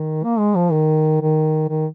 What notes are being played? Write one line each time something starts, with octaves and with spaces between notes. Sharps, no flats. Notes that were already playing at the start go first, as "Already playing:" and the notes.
Already playing: D#3
A#3
G#3
F3
D#3
D#3
D#3